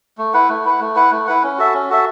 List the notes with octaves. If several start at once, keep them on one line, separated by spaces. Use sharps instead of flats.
A3
E4 B4 F#5
A3
E4 B4 F#5
A3
E4 B4 F#5
A3
E4 B4 F#5
C#4
F#4 A4 E5
C#4
F#4 A4 E5